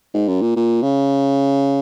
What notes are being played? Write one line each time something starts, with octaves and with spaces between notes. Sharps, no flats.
G#2
F#2
A#2
A#2
C#3